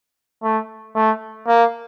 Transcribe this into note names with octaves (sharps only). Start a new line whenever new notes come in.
A3
A3
A#3